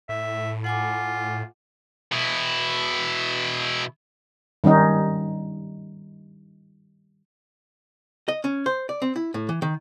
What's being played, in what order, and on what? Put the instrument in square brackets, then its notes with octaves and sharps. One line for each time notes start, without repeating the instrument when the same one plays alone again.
[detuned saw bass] A2 [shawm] E5
[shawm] F4 [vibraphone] F#5 G#5 D6
[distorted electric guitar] B2 E4
[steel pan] D#3 G3 C#4 D#4
[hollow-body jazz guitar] D#5
C#4
C5
D5
C4
E4
A2
E3
D#3